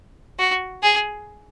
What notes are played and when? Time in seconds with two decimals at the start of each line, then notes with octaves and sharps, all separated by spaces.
0.39 F#4
0.83 G#4